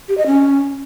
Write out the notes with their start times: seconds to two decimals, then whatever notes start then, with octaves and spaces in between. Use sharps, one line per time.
0.09 G4
0.18 D#5
0.26 C#4